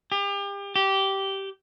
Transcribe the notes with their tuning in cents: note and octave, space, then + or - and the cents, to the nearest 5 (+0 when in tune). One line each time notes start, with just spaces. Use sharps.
G4 +35
G4 -15